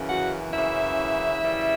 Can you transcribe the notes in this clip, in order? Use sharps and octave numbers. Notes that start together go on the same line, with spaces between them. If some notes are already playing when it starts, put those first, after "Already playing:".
Already playing: F#2 C#3 E3
F#4 F#5
F#2 C#3 E3 E4 E5
F#2 C#3 E3 G3